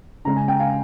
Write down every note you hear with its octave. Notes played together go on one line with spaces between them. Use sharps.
C#3 G#3 C#4 A#5
G#5
G5
F5 G#5